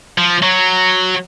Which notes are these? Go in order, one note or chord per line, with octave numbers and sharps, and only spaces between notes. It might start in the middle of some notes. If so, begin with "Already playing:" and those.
F3
F#3